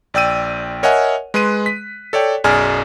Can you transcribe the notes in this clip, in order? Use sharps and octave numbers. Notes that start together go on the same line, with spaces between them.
A#1 D5 G5 E6 D#7
A#4 C#5 D#5 E5 F#5 G#5
G#3 B4 C6 F#6 D#7
B6
A4 C#5 D5 G5
B1 F#2 G#4 D5 G#5 F6